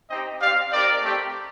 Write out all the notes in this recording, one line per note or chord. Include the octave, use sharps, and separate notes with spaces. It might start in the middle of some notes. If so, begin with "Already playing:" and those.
C4 D#4 G4 D#5 G5
C4 G4 D5 F5
C4 D#4 G4 A#4 D5
A3 C4 G4